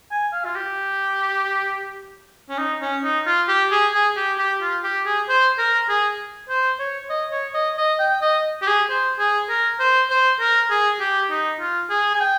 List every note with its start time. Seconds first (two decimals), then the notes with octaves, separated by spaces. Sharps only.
0.11 G#5
0.33 F5
0.45 F4
0.56 G4
2.49 C#4
2.58 D#4
2.81 C#4
3.04 D#4
3.26 F4
3.48 G4
3.71 G#4
3.93 G#4
4.16 G4
4.38 G4
4.62 F4
4.84 G4
5.06 G#4
5.29 C5
5.58 A#4
5.89 G#4
6.49 C5
6.79 C#5
7.10 D#5
7.32 C#5
7.54 D#5
7.77 D#5
8.00 G5
8.22 D#5
8.62 G4
8.67 G#4
8.89 C5
9.19 G#4
9.49 A#4
9.80 C5
10.10 C5
10.40 A#4
10.70 G#4
11.00 G4
11.30 D#4
11.60 F4
11.90 G#4
12.15 G#5
12.20 G5